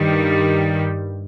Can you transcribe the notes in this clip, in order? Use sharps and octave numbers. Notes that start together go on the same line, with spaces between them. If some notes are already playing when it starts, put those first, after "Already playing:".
Already playing: G2 D#3 G3